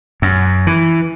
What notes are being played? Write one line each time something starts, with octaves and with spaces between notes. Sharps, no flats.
F#2
E3